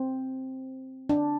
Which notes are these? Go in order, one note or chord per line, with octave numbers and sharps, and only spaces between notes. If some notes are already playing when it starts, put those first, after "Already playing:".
Already playing: C4
D4